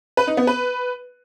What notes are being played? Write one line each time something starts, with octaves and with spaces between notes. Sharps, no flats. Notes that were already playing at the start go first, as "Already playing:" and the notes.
B4
D#4
B3
B4